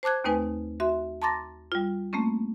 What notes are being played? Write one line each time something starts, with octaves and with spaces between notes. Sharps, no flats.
C5 A5 D6 F#6 G#6
D#2 A3 C4 D#4 B4 G#5
F#4 E5 C6
A5 A#5 C6 D6 A6 A#6
G3 F4
A3 A#3 C4 C#4